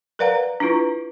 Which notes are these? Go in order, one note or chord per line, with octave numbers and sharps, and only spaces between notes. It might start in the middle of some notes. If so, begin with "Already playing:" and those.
A#4 B4 D5 F5 F#5 A#5
D4 E4 F4 B4 C#6